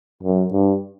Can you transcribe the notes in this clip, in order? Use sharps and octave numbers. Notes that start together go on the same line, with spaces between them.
F#2
G2